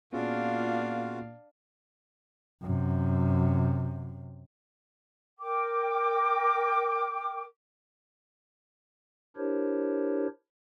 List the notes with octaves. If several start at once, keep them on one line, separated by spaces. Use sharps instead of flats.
A#2 B3 C#4 D4 F4 F#4 G#4 F5
F#2 C3
A#4 G5 D6
D4 E4 G4 A#4 C5 C#5